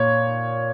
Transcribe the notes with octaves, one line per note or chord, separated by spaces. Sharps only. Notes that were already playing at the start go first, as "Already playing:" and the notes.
Already playing: A#2 C#5